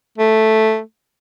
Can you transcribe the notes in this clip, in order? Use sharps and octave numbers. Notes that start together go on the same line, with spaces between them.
A3